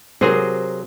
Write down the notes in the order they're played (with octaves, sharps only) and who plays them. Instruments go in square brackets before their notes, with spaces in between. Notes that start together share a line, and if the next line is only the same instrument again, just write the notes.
[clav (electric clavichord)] C3 F#3 G#4 [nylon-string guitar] A#4 C5